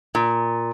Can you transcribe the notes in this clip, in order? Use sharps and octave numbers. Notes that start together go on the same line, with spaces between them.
A#2